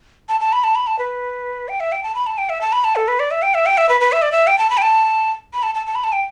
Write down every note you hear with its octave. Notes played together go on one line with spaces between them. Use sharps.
A5
A5
B5
A5
B5
A5
B4
G5
E5
G5
A5
B5
A5
G5
E5
A5
B5
A5
A4
B4
D5
E5
G5
E5
G5
E5
B4
B4
E5
D5
E5
G5
A5
B5
G5
A5
B5
A5
A5
A5
B5
A5
G5